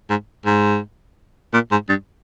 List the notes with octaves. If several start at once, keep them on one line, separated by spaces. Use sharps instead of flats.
G#2
G#2
A#2
G#2
G2